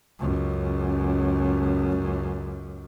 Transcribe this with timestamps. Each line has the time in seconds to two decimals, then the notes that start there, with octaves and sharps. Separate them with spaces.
0.20 C#2 F#2